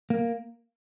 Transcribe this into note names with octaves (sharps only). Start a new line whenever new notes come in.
A#3